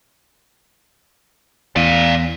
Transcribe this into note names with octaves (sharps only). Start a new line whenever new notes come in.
E2 D5 F5